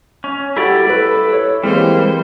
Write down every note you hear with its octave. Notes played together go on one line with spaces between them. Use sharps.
C#4
G3 E4 F#4 G4 A4 D5
A4 B4
C#5
E3 G3 G#3 A#3 C4 C5